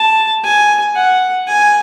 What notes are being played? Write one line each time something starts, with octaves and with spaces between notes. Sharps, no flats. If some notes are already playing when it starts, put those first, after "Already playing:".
Already playing: A5
G#5
F#5
G#5